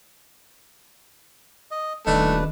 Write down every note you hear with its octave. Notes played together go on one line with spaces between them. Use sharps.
D#5
D#1 D#3 A3 D4 B4 D#5